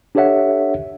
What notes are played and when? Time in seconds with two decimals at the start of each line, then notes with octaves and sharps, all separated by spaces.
0.15 D4 G4 A4 C#5 E5 F#5